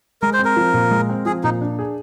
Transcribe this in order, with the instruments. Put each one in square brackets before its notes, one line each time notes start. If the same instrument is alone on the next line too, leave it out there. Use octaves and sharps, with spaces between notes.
[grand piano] G#3 [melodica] A#4
[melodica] C5
[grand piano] C4
[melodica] A#4
[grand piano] F3
A#2
G#3
C4
[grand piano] F3 [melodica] G#4
[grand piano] A#2 [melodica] D#4
[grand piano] D4
G#4